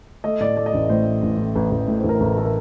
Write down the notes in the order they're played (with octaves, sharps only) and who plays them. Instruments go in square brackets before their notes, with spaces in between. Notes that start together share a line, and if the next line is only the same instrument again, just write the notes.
[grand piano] A3 D#5
A2 D5
A3 D5
D#5
A1 D5
A2 C5
A3
A1
A2
A1
A1
A2
C5
A1
A#4
A1 A4
A3 A4
A#4